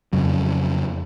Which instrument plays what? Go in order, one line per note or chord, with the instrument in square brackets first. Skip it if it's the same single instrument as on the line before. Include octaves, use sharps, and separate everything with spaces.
[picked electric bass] F2 C#3 F#3